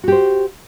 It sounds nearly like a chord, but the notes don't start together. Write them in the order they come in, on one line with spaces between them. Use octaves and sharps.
F#4 G4 C5